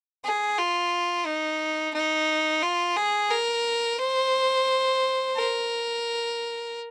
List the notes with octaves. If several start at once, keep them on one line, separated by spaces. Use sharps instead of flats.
G#4
F4
D#4
D#4
F4
G#4
A#4
C5
A#4